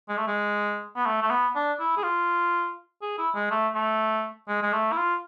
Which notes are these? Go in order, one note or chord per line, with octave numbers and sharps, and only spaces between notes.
G#3
A3
G#3
B3
A3
A3
B3
D4
E4
G#4
F4
G#4
E4
G#3
A3
A3
G#3
G#3
A3
E4
F4